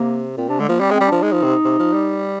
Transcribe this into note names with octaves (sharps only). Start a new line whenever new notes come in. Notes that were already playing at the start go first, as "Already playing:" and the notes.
Already playing: C3 A#3
A#2 C4
C3 D4
D3 G#3
F3 A#3
G3 C4
G#3 C4
G3
F3 D4
G#3 D#4
F3
C3
C3
F3
G3